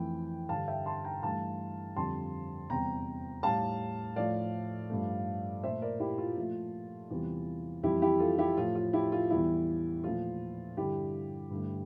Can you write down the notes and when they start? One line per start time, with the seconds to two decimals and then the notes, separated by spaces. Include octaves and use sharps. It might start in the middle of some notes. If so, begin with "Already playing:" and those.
Already playing: F2 E3 A3 G5
0.49 G2 D3 G3 F5 A5
0.68 E5 G5
0.86 A5 C6
1.04 G5 A#5
1.23 G2 E3 A3 F5 A5
1.96 F2 D3 G3 A5 C6
2.70 E2 C3 G3 G5 A#5
3.43 A2 G3 F5 A5
4.16 A2 F3 A3 D5 F5
4.90 G2 F3 A3
5.63 A#2 A3 C5 E5
5.82 A#4 D5
6.00 E4 G4
6.18 F4
6.37 A#2 F3 A3
7.10 E2 C3 E3 G3
7.83 F2 E3 G3 E4 G4
8.02 E4 G4
8.20 F4 A4
8.38 E4 G4
8.57 A2 F3 A3 F4
8.75 F4
8.93 E4 G4
9.12 F4
9.30 E2 E3 G3 E4
10.04 A#2 F3 A3 F4
10.77 G2 D3 G3 E4 G4
11.50 G2 D3 A3